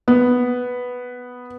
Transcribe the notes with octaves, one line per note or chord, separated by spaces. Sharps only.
B3